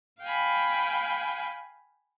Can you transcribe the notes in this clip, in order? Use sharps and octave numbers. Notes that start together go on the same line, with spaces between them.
F5 G5 G#5 B5